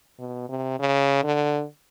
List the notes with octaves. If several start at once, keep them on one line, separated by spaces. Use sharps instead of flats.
B2
C3
C#3
D3